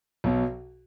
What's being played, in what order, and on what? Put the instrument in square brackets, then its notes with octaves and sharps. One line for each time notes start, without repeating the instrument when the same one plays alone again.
[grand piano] B1 B2 F#3